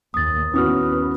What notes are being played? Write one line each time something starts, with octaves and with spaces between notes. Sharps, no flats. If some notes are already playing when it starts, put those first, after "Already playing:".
D#2 D#6 A6
D#2 B3 C#4 E4 F#4 D#6 F6